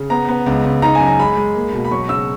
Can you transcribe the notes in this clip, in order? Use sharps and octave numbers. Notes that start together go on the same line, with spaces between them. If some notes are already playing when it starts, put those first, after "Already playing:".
Already playing: C#3
B3 A#5
B3
C#2
C#2
D#4 A#5
G#5
F#2
A#5
G#3 B5
G#3
A#3
B2
B5
F#3 C#6
C#3 E6